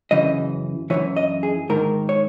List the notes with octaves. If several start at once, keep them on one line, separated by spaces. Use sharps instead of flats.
F#2 C#3 E3 D#5
F#2 C#3 E3 C#5
D#5
G#4
G#2 D#3 A#4
C#5